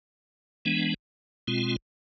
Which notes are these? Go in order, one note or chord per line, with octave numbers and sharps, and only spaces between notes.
E3 G#3 B3 D4
B2 G#3 C4 F4